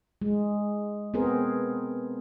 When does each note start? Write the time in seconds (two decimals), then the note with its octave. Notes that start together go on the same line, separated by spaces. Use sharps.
0.22 G#3
1.14 B3 C4 G#4 A#4 C5